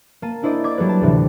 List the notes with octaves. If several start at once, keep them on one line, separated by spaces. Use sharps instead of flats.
A#3 A5 D#7
D4 E4 C5 D5 D#5
D5 D6 G#6 A6 B6
F#3 G3 A4 B4
A5
D2 A2 C3 E3